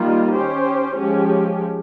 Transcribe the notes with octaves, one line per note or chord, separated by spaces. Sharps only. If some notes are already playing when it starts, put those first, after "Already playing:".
Already playing: D#3 G3 A#3 F4
C#4 G4 C5
F3 G#3 C#4 G4